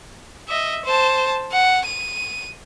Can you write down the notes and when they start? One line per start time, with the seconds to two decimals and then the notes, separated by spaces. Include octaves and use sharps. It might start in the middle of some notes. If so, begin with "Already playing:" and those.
0.48 D#5 E5
0.85 C5 A5
1.52 F#5
1.85 D#7